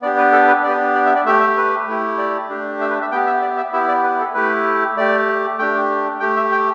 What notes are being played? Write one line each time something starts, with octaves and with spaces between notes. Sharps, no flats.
B3 D4 G4 D5
B4
A4
B4
B3 D4 G4 D5
D5
E5
D5
A3 G4 E5
E5
B4
A3 E4 G4
D5
A3 D4 G4
E5
B4
E5
B3 G4 G5
E5
D5
E5
B3 E4 G4 E5
D5
B4
A4
A3 E4 G4 B4
A3 G4 D5
A3 D4 G4 G5
A3 G4 G5
E5
G5